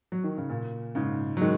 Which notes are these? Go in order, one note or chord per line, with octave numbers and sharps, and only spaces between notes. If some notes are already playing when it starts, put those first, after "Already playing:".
F#3
D#3
C#3
A#2
G#2 C#3
F#3
D#3 G#3